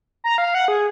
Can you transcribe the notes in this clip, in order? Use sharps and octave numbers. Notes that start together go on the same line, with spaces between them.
A#5
F5
F#5
G#4